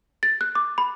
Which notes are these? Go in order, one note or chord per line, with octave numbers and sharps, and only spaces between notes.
A6
F#6
D6
B5